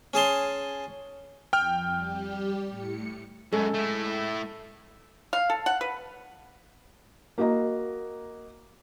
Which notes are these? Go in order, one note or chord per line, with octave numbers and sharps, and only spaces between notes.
C#4 G#4 A5 C6
F2 G5 F6
G3 G4
A2 C#7
F#2 G#3 A4
A3 E4
F5
A4
F#5
B4
A#3 F#4 D#5 A#5